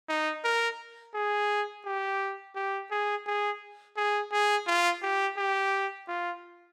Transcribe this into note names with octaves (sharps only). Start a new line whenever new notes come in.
D#4
A#4
G#4
G4
G4
G#4
G#4
G#4
G#4
F4
G4
G4
F4